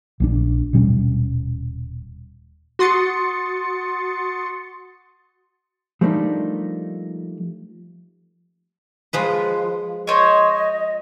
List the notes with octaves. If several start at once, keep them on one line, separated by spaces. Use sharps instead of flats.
A#1 G3 D4
D#1 B2 G3 C#4
F#4 C6 D#6 A6 C#7
F3 G3 A3 A#3 D4 D#4
F3 G#3 B4
C5 C#5 D#5